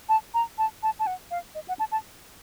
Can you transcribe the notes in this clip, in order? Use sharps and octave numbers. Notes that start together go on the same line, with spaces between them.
A5
A#5
A5
A5
A5
F#5
F5
D#5
F#5
A5
A5